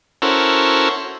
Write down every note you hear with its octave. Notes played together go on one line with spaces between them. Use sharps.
C#4 E4 F#4 A4 A#4 C5